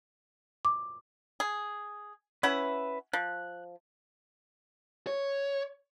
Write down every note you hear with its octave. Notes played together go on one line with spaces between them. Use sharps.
D6
G#4
C#4 E4 B4 E5 F#5
F3 F#6
C#5